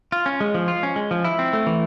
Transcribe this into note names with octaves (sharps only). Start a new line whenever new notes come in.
F4
C#4
G#3
F3
F4
C#4
G#3
F3
E4
C4
A3
E3